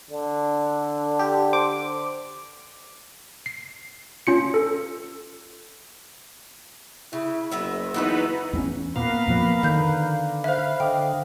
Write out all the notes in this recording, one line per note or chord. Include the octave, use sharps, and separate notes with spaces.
D3
G4
C5 D6
C7
C#4 F4 C#7
A4
C#3 E4
F#1 F#3 B3 E5
E3 B3 D#4 E4 F#4 B4
E2 B3 C#4
A#2 A#3 B3 A#4 B4 F5
F2 A#2 F3
D3 D#3 F5 G6
B4 C5 E5 F5
D3 D5 D#5 F5 G5